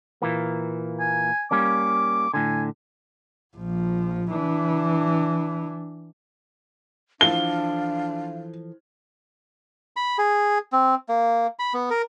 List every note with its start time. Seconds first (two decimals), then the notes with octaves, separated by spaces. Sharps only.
0.22 A#2 E3 A#3
1.00 G#5
1.51 G3 A#3 C#4 D6
2.34 A2 D3 G#5
3.56 A#1 F3
4.31 E3 D4
7.21 E3 F3 D4 A4 F5 G7
9.96 B5
10.18 G#4
10.72 C4
11.09 A#3
11.59 B5
11.73 B3
11.90 A#4